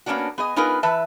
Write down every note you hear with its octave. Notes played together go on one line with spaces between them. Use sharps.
A#3 B3 C#4 D4 F#4
B3 G#4 D#5
B3 D#4 F4 G#4 A#4 B4
E3 B4 E5 A5